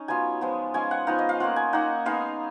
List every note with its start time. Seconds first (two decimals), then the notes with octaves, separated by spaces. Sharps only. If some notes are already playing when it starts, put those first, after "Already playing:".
Already playing: C#4 D#4
0.08 F#3 B3 F4 G#5
0.41 F3 G#3 B3
0.74 G#3 C#4 F4 G#5
0.91 F#5
1.07 F3 B3 D#4 F5
1.19 D#5
1.29 F5
1.40 A#3 C#4 F4 F#5
1.56 G#5
1.73 A#3 D#4 F#5
2.06 G#3 B3 D#4 F5